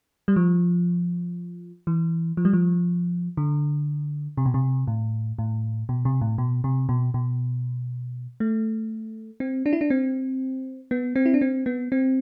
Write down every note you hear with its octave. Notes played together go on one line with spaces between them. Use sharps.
G3
F3
E3
F3
G3
F3
D3
C3
B2
C3
A2
A2
B2
C3
A2
B2
C3
B2
B2
A3
C4
D4
E4
D4
C4
B3
C4
E4
D4
C4
B3
C4